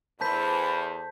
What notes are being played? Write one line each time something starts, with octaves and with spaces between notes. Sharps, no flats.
E2 A4 C5 A5 B5 G6 B6